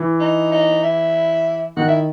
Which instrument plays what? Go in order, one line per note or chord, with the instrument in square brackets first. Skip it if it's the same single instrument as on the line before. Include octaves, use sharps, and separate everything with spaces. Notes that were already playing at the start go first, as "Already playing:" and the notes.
Already playing: [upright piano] E3
[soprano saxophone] D#4
D#4
E4
[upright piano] D#3 [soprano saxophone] F#4
[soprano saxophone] E4